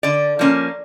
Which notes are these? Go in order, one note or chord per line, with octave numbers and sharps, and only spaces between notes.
D3 D5
F3 A#3 C#4